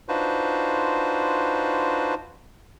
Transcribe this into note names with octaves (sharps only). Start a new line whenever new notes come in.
D4 D#4 F4 F#4 B4 C5